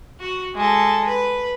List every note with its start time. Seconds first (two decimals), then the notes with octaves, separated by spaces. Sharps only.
0.20 F#4
0.55 G#3 A4
1.06 B4